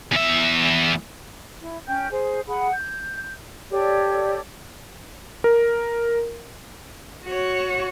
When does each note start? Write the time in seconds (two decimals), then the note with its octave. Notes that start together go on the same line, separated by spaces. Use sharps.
0.12 E2 E5
1.61 E4
1.86 C#4 G5 G6
2.10 G#4 C5
2.47 G#4 F#5 B5
2.72 G6
3.70 G4 A4 C#5 D5
5.44 A#4
7.26 F#4 C#5